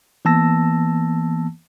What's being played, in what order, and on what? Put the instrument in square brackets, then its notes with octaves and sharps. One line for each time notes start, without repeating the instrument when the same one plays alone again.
[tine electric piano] E3 A#3 B3 A5 E6 A#6